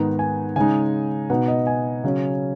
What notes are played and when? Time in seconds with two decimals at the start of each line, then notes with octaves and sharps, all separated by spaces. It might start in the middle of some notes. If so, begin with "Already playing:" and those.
Already playing: G#2 D#3 B3 D#4 F#5
0.19 G#5
0.56 C#3 G#3 D#4 G#5
1.30 B2 B3 D#4 F#5
1.48 D#5
1.67 G#5
2.04 C#3 F#3 C#4